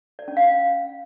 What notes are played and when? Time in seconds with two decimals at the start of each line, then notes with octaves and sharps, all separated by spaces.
0.19 D5
0.28 C#4
0.37 F5